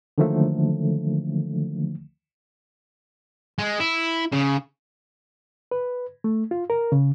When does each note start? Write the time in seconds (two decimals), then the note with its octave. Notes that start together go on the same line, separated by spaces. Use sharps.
0.18 D3 D#3 F3 F#3 A3 A#3
3.58 G#3
3.80 E4
4.32 C#3
5.71 B4
6.24 A3
6.51 F4
6.70 A#4
6.92 C#3